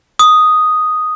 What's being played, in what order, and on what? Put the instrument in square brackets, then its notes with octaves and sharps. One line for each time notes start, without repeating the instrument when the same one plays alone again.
[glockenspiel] D#6